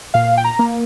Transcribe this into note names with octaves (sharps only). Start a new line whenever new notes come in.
A#2 F5
G5
A#5
A#3